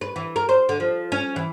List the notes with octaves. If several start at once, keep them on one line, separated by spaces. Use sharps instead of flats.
B4
E3
A#4
C5
D3
F3
C#4
E3